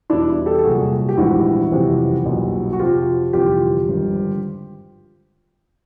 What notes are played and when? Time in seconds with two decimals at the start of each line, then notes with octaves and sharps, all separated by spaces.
0.10 E2 B2 G3 D4 E4
0.46 G4 A4
0.59 A4
0.64 C2 A#2 F#3 F#4 G#4
1.09 G4
1.17 A#1 G#2 E3 G3 E4 F#4
1.71 F#1 F2 C3 E3 G3
2.25 B1 A#2 G3
2.73 F#4
2.79 F2 C3 F3 F4 G4
3.33 G1 F2 C3 E3 F4 G4
3.87 G#1 G2 D3 F3